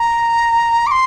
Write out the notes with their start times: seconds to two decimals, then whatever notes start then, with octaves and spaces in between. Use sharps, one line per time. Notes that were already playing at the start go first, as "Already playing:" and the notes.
Already playing: A#5
0.87 D6
0.91 C6